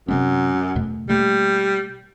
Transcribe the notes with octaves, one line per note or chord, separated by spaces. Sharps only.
F#2 C3 G#3 C4
E2 B2 A3
B2 G3 A3 A#3